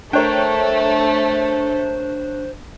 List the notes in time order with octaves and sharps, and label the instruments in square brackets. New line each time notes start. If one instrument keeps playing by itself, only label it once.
[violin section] A3 [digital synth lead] D4 [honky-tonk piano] A#4 C#5 G5 [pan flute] C5